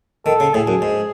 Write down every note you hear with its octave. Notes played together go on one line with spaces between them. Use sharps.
D#3 A4
C#3
A2 G#4
F#2
G#2